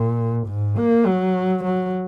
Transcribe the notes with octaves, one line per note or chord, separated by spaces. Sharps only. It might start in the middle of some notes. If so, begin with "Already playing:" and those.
Already playing: A#2
G#2
A#3
F#3
F#3